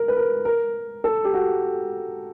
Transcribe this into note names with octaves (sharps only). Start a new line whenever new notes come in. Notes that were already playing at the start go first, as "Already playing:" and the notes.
Already playing: A#4
B4
A#4
A#4
A4
G4
F#4